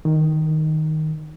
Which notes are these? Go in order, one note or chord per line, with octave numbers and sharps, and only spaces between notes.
D#3